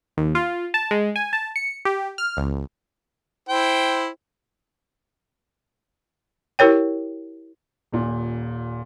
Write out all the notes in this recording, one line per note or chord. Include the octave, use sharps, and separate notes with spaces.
D#2
F4
A5
G#3
G#5
A5
C#7
G4
F6
C#2
E4 C5 G5
E4 G4 A#4 C#5 G5
D#1 A#2